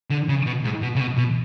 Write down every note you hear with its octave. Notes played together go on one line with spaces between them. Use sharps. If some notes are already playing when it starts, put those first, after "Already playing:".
D3
C#3
B2
G#2
B2
C#3
B2
B2